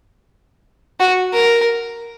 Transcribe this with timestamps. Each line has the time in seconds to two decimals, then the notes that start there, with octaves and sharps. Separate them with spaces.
1.00 F#4
1.34 A#4